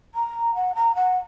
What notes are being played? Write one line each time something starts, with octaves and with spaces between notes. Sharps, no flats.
A#5
F#5
A#5
F#5